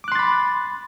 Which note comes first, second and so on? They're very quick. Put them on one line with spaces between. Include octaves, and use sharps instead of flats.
D6 F#6 C6 A6 B5